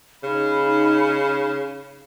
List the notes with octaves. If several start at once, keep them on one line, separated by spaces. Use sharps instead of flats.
C#3 D#4 B5